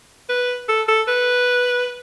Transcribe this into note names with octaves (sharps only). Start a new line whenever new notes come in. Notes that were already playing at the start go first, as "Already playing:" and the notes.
B4
A4
A4
B4